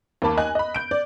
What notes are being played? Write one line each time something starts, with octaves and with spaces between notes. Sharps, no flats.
D#2 D#3 A#3 A5 B5 D6
D#5 G#5 F#6
D#5 B5
G6 D7
D5